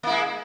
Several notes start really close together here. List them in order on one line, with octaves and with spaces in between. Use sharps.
A#3 E4 G#3